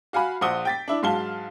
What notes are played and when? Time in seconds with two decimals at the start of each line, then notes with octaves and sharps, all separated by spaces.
0.13 F#4 F5 G#5 B5
0.41 A#1 C5 F#5 D#6 G7
0.65 G5 A6 B6
0.88 D4 E4
1.02 G#2 F#3 F5 A5 G7